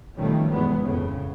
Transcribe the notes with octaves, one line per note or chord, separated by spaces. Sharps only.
B2 D#3 F3 G3 A3 C#4
G1 E2 G#3 B3
F2 A2 C#3